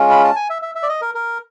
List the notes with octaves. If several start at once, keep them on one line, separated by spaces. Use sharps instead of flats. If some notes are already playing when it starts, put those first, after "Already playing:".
Already playing: G#3 C#4 F4
B5
A5
G#5
E5
E5
E5
D5
D#5
A#4
A#4